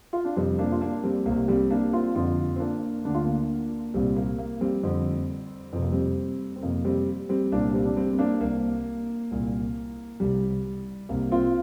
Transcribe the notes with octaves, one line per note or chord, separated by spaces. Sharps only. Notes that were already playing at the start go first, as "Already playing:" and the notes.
F4
D4
F2 C3 G3 C4
A#3 D4
F4
A#3 D4
G3 C4
C2 C3 A#3
G3 C4
A#3 D4
C4 F4
F2 D3 C4 F4
C4
A#3 D4
D2 D3 D4
F4
A#3 D4
C2 A#2 G3 C4
A#3
A#3
G3 C4
F2 D3
F2 C3 C4
A#3
G3 C4
C4
F2 C3 A#3
G3 C4
G3 C4
C2 A#2 A#3 D4
G3 C4
D4
G3 C4
C4
A#3 D4
C2 C3 A#3
C2 A#2
C2 C3 G3
C2 C3 A#3
C4 F4